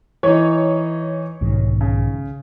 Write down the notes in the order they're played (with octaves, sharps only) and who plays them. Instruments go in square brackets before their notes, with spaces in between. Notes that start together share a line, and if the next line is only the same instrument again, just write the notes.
[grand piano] E3 D#4 [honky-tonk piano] C#5
[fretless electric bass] B1 G#2 D#3
[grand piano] C#3